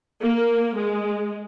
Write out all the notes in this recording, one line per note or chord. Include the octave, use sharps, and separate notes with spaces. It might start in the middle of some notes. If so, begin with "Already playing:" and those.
A#3
G#3